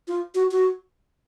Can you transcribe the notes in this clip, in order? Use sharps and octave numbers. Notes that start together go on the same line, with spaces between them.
F4
F#4
F#4